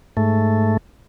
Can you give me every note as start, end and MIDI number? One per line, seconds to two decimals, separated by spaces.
0.17 0.77 44
0.17 0.77 57